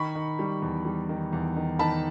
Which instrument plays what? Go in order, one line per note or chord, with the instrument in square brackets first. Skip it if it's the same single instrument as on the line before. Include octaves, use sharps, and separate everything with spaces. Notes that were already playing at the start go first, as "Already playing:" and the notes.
Already playing: [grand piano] D#3 B5 C#6
D#3
G3
E2
G3
D#3
E2
D#3
D#3 A5 B5